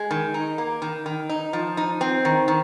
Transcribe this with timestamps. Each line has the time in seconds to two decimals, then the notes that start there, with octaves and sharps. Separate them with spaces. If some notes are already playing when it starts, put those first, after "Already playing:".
Already playing: G#3
0.11 D#3
0.34 D#4
0.58 A#3
0.82 D#3
1.06 D#3
1.29 D#4
1.53 F3
1.77 D#4
2.01 C4
2.25 D#3
2.48 D#3